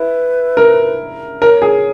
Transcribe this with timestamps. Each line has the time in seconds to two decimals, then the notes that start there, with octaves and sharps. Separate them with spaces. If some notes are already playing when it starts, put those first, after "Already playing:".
Already playing: E4 B4
0.57 A#4
1.41 A#4 C#5
1.62 G#4